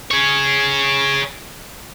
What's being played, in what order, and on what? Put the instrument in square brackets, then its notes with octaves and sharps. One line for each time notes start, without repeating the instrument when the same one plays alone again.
[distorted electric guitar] G#4 C#5